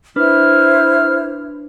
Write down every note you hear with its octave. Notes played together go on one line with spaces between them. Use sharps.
D4 E4 B4 C5 F6